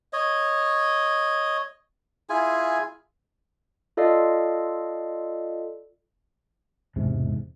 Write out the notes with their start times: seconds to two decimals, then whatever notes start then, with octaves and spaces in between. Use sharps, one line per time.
0.13 C#5 D#5
2.30 E4 F4 G#4 G#5
3.97 F4 A4 D5 D#5 F5
6.96 E1 G#2 C3